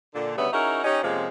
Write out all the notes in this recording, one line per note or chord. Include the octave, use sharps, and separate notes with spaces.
A#2 D3 D4
D2 C#3 G3 B3 C#5 E5
C#4 D#4 E4 F#4 G#4 A#4
C#4 D#4 G4
F2 C3 F3 G#3 A#3 C#4